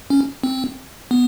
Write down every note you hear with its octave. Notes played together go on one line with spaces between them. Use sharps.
C#4
C4
B3